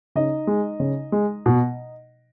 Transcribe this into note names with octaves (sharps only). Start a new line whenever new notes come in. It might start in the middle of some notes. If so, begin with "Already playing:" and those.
C#3 D#4 D#5
G#3
C#3
G#3
B2